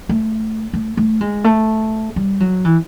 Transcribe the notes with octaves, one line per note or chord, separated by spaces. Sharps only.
A3
A3
A3
G#3
A3
G3
F#3
E3